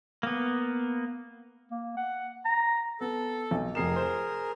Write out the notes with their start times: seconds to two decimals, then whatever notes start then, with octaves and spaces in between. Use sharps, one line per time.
0.23 A#3 B3
1.71 A#3
1.97 F#5
2.45 A#5
3.01 B3 A4
3.51 B1
3.75 F1 G#4 A#4 C7 E7
3.96 C5